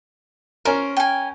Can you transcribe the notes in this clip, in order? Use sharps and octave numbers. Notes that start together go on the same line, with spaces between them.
C#4 A#4 C5
G5 G#5